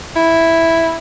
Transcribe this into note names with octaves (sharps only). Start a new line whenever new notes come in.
E4